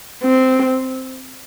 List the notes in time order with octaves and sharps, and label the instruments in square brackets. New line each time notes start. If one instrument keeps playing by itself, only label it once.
[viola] C4